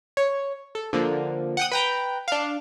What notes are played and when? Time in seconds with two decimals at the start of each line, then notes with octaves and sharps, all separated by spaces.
0.17 C#5
0.75 A4
0.93 D3 F3 A#3
1.57 F#5 G5 D#6
1.71 B4 G5 A#5
2.28 D4 F5